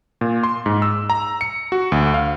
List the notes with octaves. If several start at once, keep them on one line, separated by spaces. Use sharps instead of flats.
A#2
C6
G#2
E6
A#5
C#7
F#4
D2
F5